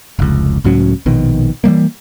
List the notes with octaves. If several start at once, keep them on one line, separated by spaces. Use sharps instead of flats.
F1 C#2
C#2 A2 F#3 C#4
A#1 B2 D#3
E3 F3 G3 A#3